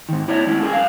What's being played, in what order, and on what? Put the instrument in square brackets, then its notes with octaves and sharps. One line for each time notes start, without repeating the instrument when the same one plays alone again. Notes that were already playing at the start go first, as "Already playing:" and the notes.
[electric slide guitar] G#2 D#3
E4 C#5 D5 E5
G#3 C#4 E4
G#4 A#4 F5 G#5
F#2 F5